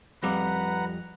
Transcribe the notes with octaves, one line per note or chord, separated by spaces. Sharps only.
F2 G3 B4 F#5 A#5